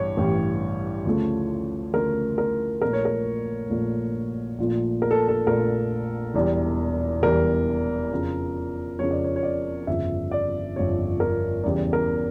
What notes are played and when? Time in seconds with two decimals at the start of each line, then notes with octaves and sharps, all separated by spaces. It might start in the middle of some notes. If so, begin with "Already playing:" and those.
Already playing: A1 G2 E3 C#5
0.17 A1 G2 E3 G3
1.05 D2 C#3 F3 A3
1.94 D2 C#3 F3 A3 A#4
2.38 A#4
2.81 A#1 A#2 A3 A#4
2.93 C#5
3.05 A#4
3.70 A#1 A#2 A3
4.58 A#1 A#2 F3 A3
5.02 A#4
5.11 A4
5.28 A4
5.47 A#1 A#2 F3 A3 A#4
6.34 E1 E2 E3 G3
7.22 E1 E2 E3 G3 A#4
8.11 F2 C#3 F3
8.99 F2 C#3 F3 C#5
9.11 D5
9.24 C#5
9.36 C#5
9.43 D5
9.87 G1 F2 C#3 F3 E5
10.31 D5
10.76 G1 F2 C#3 F3 C#5
11.20 A#4
11.63 E2 C#3 E3 G3
11.93 A#4